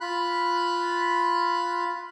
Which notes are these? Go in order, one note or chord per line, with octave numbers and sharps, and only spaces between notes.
F4 B5 F#6